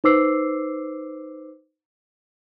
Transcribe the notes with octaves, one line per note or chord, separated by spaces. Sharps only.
D#4 B4 C5 D6 E6 C7